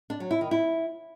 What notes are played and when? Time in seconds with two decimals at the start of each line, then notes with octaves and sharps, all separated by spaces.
0.10 D4
0.20 F#3
0.31 E4
0.41 D#3
0.51 E4